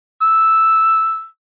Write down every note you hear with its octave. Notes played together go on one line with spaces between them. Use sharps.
E6